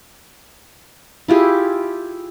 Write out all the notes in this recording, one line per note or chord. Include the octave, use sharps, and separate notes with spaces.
E4 F4 G4 G#4